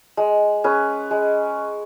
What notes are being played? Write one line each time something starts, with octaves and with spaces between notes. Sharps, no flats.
G#3
C#4 G#4 B4
G#3